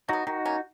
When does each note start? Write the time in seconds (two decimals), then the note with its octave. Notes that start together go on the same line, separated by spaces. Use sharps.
0.09 F#3 B3 D#4 F#4
0.27 D#3 D#4 F#4
0.45 A#3 C#4